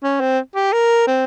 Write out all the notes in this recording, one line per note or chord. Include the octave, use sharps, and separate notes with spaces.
C#4
C4
G4
A#4
C4